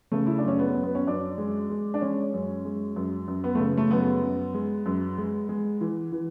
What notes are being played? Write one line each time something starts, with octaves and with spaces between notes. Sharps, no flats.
C#3 A3
E4
D4
F#2 C#4
B3
F#2
B3
C#4
F#2 D4
G#3
G#3
D4
G#3 C#4
F#2
G#3
F#2
F#2
B3
C#3 A3
A3
F#2 B3
F#2
G#3
F#2
G#3
G#3
E3
E3